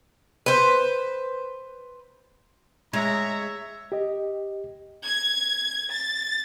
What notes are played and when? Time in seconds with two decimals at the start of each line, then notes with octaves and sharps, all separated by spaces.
0.46 B4 C5
2.93 G#3 C#5 E5 A#5
3.92 G4 D#5
5.04 G#6
5.89 A6